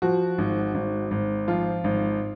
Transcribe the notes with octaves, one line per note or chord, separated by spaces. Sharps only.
F3 F#4
G#1
G#1
G#1
F3 F4
G#1